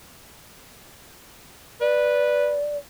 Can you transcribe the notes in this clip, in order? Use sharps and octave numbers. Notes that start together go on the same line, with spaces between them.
B4 D5